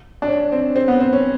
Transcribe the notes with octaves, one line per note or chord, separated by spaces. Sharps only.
D4
C#4
C4
C4
B3
C4
C#4